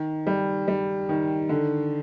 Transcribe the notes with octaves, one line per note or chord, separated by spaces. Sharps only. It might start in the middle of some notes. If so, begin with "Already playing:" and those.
Already playing: D#3
G3
G3
D#3
D3